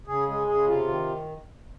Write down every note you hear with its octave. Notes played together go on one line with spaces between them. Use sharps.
C#3 G#4
G#3 G#4
C#3 G#4
C3 F4
D#3